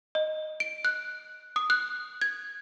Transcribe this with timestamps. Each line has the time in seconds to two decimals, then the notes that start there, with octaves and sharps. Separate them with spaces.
0.15 D#5
0.60 D7
0.85 F#6
1.56 D#6
1.70 F#6
2.21 G#6